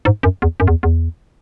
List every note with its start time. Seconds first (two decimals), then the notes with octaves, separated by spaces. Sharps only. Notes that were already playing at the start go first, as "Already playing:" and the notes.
0.05 G#2
0.23 F#2
0.42 E2
0.60 F#2
0.67 E2
0.83 E2